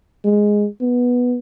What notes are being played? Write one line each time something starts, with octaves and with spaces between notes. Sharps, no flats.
G#3
B3